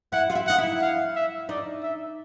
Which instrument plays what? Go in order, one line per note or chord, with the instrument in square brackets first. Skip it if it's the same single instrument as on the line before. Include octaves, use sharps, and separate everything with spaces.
[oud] E4 [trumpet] F#5
[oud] F4
E4
[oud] D#4 [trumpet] F#5
[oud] E4
[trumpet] F5
E5
[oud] D#4 [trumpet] D5
[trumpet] E5